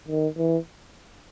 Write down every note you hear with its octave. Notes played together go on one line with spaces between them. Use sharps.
D#3
E3